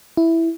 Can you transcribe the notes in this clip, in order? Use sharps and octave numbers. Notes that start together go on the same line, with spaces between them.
E4